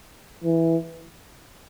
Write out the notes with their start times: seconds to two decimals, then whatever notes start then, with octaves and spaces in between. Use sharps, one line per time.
0.44 E3